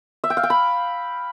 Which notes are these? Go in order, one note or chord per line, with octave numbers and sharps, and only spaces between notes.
E5
G5
F5
G5
B5